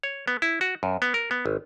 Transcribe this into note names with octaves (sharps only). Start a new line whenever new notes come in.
C#5
B3
E4
F#4
F#2
B3
A#4
B3
G#1